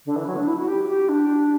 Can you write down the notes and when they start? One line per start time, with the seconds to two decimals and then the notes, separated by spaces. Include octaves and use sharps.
0.06 D3
0.16 E3
0.27 F#3
0.37 D4
0.48 E4
0.57 F#4
0.68 G4
0.89 G4
1.09 D4